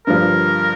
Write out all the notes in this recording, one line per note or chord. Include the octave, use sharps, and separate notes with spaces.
G2 D3 F3 A#4